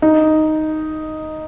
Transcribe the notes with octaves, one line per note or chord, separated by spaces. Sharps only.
D#4